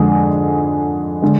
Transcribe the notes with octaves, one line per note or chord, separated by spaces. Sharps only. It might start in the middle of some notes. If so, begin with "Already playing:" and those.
Already playing: F2 D3 G#3 G#4
D3 G#3